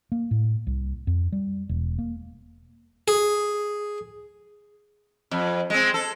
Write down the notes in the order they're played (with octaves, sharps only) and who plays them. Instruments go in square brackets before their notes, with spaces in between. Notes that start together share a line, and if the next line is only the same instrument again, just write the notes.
[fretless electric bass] A#3
A2
C2
F2
G3
E1
A#3
[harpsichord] G#4
[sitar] F2
G#3 C4
A4